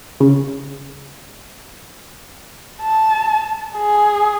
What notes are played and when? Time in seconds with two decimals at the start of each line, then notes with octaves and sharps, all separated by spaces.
0.20 C#3
2.82 A5
3.76 G#4